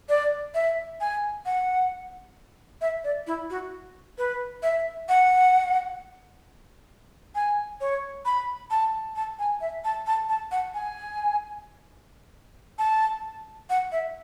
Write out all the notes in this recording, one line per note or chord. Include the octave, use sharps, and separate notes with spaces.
D5
E5
G#5
F#5
E5
D5
E4
F#4
B4
E5
F#5
G#5
C#5
B5
A5
A5
G#5
E5
A5
A5
A5
F#5
G#5
A5
F#5
E5